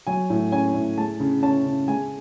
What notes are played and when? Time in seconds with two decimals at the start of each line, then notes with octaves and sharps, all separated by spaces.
0.07 F#3 G#5
0.30 A2
0.52 C#4 G#5
0.74 A2
0.98 G#3 A5
1.20 C#3
1.43 C#4 A5
1.66 C#3
1.88 G#3 G#5